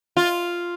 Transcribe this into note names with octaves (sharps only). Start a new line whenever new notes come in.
F4